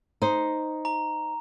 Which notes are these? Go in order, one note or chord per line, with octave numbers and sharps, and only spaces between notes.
D#4 C5
A#5